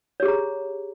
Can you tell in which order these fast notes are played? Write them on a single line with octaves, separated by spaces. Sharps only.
C#5 G4 G#4 A#5